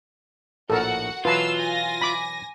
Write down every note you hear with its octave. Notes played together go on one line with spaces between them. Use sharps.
A#1 A2 A3 F#4 A4 A#4 F#5
B2 E3 F#3 F4 B4 A5 E6 C7
G#5 A#6
B5 D6